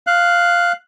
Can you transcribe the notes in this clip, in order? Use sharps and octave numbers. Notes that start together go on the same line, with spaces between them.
F5 F#6